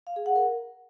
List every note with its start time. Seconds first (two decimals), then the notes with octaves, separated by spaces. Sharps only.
0.07 F5
0.16 G#4
0.26 F#5
0.36 A#4